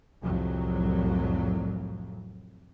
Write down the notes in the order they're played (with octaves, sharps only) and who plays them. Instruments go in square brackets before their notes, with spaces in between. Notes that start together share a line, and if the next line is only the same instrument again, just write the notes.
[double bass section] C2 F2 A2 F#3